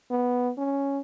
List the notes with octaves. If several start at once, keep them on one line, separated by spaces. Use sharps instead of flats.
B3
C#4